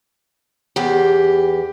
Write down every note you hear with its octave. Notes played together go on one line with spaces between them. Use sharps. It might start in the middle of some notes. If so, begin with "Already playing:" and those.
E2 G4